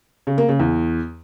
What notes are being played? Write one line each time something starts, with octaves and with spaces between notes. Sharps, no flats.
C#3
A#3
C#3
E2